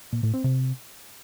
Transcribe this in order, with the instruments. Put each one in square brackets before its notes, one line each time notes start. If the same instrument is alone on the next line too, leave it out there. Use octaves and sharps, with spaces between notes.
[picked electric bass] A#2
A2
C4
C3